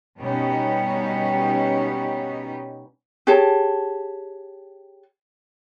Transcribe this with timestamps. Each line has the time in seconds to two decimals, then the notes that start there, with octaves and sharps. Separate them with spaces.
0.19 B2 G3 B3 C#4 D#4 G4
3.27 G4 G#4 C#5 A5